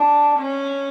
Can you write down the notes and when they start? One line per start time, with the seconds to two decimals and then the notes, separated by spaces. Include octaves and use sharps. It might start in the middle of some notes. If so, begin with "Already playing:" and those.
Already playing: D4
0.39 C#4